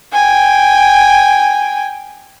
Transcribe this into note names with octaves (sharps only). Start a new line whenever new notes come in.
G5 G#5